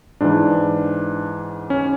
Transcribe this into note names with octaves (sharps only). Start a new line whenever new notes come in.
G#2 E3 D4
C#4